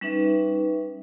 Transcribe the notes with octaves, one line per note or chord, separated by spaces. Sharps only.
G3 C#4 D#4 B4 E5